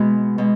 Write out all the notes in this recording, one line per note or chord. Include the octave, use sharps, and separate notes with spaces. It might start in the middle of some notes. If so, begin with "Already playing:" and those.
Already playing: B2 G#3 B3
B2 G#3